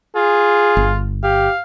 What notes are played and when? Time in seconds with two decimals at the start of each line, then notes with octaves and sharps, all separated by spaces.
0.16 F4 G#4
0.77 G1
1.23 G4 F5